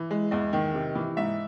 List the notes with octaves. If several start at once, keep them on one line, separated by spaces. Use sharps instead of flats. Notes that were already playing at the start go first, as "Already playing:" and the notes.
Already playing: E3
G#3
E2 D#5
D#3
C3
E3
G#2 E5